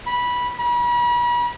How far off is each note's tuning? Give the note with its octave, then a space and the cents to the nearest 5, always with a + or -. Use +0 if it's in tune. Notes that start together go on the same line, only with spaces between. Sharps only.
B5 -15
B5 -40